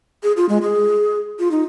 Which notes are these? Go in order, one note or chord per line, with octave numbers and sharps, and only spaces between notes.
G#4
F4
G#3
G#4
F4
D#4